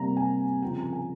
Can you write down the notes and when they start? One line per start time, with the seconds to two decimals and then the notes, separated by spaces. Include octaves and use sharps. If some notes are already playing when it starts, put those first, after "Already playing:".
Already playing: C3 G3 A#3 A#5
0.17 G#5
0.62 C#3 F3 C4 G5
0.78 A#5
0.93 G#5